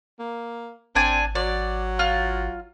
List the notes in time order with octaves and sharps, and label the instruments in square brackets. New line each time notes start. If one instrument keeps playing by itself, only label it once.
[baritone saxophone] A#3
[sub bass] G#1 [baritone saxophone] C4 [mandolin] D4 D5 G#5
[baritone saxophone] F#3 [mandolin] D5
[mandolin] F4 F6